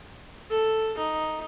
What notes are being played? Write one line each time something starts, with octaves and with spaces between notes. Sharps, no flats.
A4
D#4